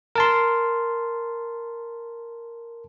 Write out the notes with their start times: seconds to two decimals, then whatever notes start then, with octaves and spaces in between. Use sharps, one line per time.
0.15 A#4 A5 C6